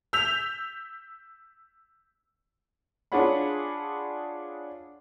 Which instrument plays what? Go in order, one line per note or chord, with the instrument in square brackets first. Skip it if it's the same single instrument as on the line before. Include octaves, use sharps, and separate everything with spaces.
[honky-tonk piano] E6 G6 B6 F7
[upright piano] D4 F4 G#4 C#5 F#5 B5